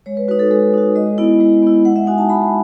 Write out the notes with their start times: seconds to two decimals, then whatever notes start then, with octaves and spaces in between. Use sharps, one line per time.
0.06 G#3 C#5
0.17 B4
0.28 D#4 F#4 B4
0.39 A4
0.51 G#3 A4
0.74 D#4 F#4
0.96 G#3 D#5
1.18 B3 E4
1.40 G#3
1.62 B3 E4
1.85 G#3 F#5
1.96 E5
2.07 D#4 F#4 G#5
2.18 A5
2.29 G#3 B5